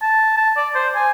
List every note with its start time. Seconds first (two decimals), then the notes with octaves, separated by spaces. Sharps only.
0.02 A5
0.37 A5
0.57 D5
0.75 C5
0.95 G#5